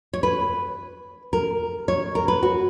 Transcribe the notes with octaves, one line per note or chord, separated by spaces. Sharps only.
C#5
B4
A#4
C#5
A#4
B4
F#4